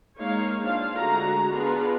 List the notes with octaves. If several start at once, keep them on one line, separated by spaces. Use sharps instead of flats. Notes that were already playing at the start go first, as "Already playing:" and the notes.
G#3 A#3 D#4 C#5 F5
C4 D4 F4 F5
D3 G#3 A3 F#4 G#4 A#5
B3 D4 F4 G#4